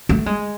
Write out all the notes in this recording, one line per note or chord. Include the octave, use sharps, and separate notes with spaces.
A3
G#3